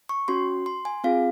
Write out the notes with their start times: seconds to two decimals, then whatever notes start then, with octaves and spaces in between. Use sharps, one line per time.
0.09 C#6
0.28 C#4 F#4 C6
0.66 C6
0.85 G#5
1.04 C4 F4 G#4 F5